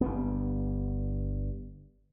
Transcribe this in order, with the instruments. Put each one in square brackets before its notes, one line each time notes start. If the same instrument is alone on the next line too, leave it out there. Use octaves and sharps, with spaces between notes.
[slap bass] G1 G2 B3